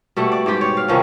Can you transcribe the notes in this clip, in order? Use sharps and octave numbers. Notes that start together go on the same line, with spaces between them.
B2 G3 A3 F#5
D5
G#2 G3 G4 G5
C#5
F5
C3 D#3 F3 C#4